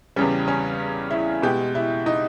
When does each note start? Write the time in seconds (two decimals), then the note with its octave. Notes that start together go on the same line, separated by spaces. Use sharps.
0.16 E2 C#3 G3 C#4
0.48 C#4
1.11 E4
1.42 B2 G#3 G4
1.75 E4
2.06 D#4